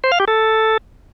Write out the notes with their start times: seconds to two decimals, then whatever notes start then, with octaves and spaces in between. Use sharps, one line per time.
0.04 C5
0.12 F5
0.20 G4
0.28 A4